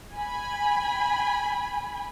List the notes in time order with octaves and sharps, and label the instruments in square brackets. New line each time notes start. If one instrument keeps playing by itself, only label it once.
[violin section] G#5 B5